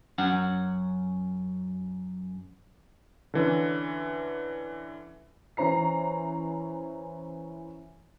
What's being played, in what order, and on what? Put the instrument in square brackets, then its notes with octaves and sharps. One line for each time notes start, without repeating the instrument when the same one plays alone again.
[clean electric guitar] F#2 C#4 F#5
[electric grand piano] D3 E3 C#4
[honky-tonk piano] E3 C#4 C5 A#5 C7